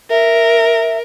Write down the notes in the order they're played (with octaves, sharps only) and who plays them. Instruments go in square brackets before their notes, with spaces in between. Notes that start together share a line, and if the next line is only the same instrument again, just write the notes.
[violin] A#4 [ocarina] E5